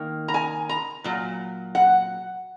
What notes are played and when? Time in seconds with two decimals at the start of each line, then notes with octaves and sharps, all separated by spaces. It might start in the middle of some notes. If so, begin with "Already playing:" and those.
Already playing: D#3 A#3
0.28 A#5
0.34 G#5
0.69 A#5
1.04 A#2 F#3
1.75 F#5